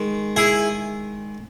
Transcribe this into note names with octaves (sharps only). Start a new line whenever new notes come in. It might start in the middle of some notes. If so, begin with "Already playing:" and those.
Already playing: D#3 G#3
E4 G#4